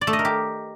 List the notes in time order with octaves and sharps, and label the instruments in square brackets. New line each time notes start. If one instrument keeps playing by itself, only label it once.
[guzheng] D5
A3
D#5
A#4
G4